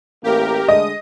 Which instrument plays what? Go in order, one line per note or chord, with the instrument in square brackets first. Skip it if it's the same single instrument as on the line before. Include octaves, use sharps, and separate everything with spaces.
[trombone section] A1 A#3 [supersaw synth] G4 A#4
[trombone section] D3 G#3 A3 [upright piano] D#5 [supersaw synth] D#6